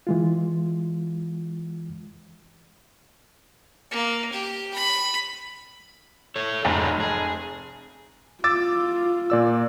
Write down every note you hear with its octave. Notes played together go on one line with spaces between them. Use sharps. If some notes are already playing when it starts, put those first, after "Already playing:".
E3 G#3 F4
A#3
G4
B5
A4 C#5
F1 G#2 F#3 G#4
G#4
F4 D6 E6 A6
A#2 D5 E6